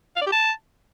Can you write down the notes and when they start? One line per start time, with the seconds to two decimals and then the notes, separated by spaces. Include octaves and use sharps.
0.16 F5
0.22 D5
0.27 G4
0.32 A5